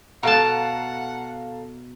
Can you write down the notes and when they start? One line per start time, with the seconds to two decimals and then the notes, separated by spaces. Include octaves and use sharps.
0.23 B2 A4 F5 F#5 A5 A#5